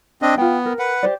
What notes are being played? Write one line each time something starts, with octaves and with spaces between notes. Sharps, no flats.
C4 D4 D#5
B3 F4 G5
A#4
B4 F#5
G4 C5 D5